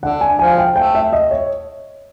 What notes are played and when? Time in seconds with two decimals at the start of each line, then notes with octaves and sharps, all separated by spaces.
0.03 D3 F#5
0.21 G#5
0.39 F3 G#5
0.58 G5
0.76 A3 G5
0.95 E5
1.13 D#5
1.31 C#5